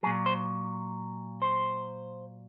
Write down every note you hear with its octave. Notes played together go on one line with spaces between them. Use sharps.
A#2 F#3 G#4
C5
C5